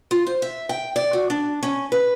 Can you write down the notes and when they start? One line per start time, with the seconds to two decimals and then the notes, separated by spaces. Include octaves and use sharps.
0.11 F4
0.26 C5
0.42 E5
0.69 G5
0.96 D5
1.13 F#4
1.30 D4
1.63 C#4
1.92 B4